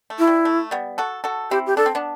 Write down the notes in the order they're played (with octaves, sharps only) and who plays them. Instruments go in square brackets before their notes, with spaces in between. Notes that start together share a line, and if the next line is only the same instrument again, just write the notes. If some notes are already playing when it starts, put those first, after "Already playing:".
[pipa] A3
[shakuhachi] E4
[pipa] G3
A3
G3 B3
F#4 A4
F#4 A4
[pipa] C4 E4 [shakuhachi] G4
[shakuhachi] G4
[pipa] D4 [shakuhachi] A4
[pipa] C4
B3 D4